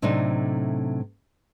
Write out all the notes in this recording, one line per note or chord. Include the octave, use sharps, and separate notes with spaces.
A2 C3 F#3 A3 D4 D#4